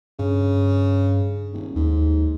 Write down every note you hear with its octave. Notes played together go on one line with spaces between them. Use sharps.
G2 C#3
D#1
D#2 G#2